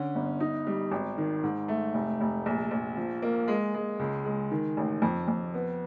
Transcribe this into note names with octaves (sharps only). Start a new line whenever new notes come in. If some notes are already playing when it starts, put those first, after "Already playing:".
Already playing: D3 C#4
G1
D#4
G3
G#1
D#3
G#2
A3
F1
F1
A#1
A#1
F3
A#3
G#3
G#3
C#2
G#3
D#3
A1
F2
F2
B3